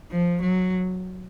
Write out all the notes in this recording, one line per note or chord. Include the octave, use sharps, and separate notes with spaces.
F3
F#3